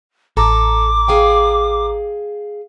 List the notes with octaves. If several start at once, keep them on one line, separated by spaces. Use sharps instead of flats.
A1 A4 A#5 D6
G#4 F5 G5